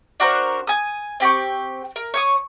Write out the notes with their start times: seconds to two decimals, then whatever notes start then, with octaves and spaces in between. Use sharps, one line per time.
0.20 D4 F#4 A#4 C5
0.67 G#5 D#6
1.20 C4 G4 G5 C#6
1.96 A#4
2.14 C#5 C#6 D#6